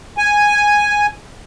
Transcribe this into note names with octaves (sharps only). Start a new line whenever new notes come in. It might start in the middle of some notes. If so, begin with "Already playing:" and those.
G#5